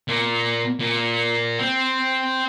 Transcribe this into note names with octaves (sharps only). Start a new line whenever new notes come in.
A#2
A#2
C4